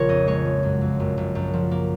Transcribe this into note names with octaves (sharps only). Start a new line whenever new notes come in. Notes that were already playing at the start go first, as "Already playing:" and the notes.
Already playing: A#1 C#3 F3 A#4 C#5
F2 D#5
G#3 C#5
F3
F#2
F2
F#1
F#1
F#2
F3
A#3